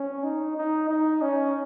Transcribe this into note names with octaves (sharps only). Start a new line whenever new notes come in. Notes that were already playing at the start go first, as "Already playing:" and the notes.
Already playing: C#4
D#4
D#4
D#4
C#4